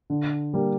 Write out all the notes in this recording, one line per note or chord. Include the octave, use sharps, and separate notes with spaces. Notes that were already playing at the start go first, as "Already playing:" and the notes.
D3
G3 A#3